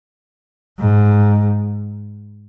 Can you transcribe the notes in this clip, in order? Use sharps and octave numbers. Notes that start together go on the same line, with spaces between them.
G#2